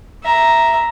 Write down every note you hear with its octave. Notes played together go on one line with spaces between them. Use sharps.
E5 A#5